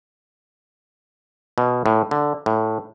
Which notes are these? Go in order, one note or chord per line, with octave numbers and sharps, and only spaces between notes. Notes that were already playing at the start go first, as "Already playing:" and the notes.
B2
A2
D3
A2